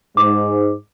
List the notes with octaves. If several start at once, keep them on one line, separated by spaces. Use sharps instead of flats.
G#2 D6